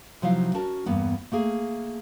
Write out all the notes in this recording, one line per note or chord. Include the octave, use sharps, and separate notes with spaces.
C3 F3 F#3 D#4 E4 F5
C#4 F#4 A#4 A5
E2 G2 A#3 B3
A3 A#3 G#4